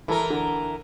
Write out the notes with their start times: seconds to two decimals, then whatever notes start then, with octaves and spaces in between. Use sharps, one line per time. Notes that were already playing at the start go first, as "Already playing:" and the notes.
0.08 E3 E4 A4 A#4
0.30 D3